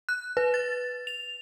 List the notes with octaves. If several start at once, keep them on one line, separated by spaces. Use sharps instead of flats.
F#6
B4
A6
F7